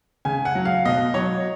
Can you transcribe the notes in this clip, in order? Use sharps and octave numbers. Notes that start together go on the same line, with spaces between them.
C#3 G#5
F#5
F#3
F5
B2 D#5
F#3 C#5